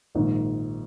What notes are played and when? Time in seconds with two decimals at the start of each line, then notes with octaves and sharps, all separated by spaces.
0.15 A#1 G#2 D#3